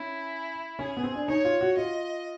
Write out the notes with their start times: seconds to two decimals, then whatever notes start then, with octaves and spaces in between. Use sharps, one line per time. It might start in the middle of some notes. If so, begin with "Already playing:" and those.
Already playing: C#4 E4
0.79 C#4 G#4
0.97 B3
1.03 C4
1.16 D4
1.28 D#4 C#5
1.45 F4
1.61 F#4
1.77 F4 D#5